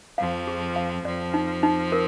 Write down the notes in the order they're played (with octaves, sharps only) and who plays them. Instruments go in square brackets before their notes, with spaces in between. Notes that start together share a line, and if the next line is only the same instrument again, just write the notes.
[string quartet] F2 F3 [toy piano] F5
[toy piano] G#4
F5
[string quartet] F2 F3 [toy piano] D5
[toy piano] D#4
D#4
A#4